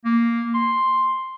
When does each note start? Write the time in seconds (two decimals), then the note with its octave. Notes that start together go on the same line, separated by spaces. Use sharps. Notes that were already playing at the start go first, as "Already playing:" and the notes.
0.05 A#3
0.55 C6